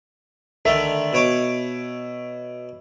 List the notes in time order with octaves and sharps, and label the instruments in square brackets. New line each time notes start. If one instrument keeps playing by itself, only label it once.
[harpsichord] D3 D#3 A3 [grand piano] E5
[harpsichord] B2 C#5 D6